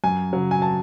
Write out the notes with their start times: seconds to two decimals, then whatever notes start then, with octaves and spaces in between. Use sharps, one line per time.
0.04 F#2 G#5
0.33 C#3 F#3
0.51 G#5
0.62 A5